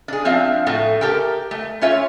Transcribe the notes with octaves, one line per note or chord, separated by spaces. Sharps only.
D4 G#4
F3 C4 D4 E5 F5
A2 A3 F#4 A4
G4 A4 A#4 G5
A3
C#4 F4 C#5 E5